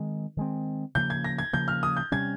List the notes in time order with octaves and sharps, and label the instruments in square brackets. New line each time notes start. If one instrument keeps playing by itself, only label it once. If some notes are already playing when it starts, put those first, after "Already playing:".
Already playing: [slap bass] D#3 G#3 C4
D#3 G#3 C4
[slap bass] C#3 F3 A#3 [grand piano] G6
[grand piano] G#6
A#6
G#6
[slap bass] C#3 F3 A#3 [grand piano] G6
[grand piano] F6
D#6
G6
[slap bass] C3 G3 C#4 [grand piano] G#6